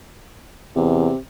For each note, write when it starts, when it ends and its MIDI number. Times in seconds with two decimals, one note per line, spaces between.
0.76 1.10 40
0.76 1.17 48